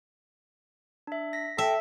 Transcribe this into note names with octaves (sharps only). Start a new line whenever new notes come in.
D4 E5
A#6 B6
A4 E5 G5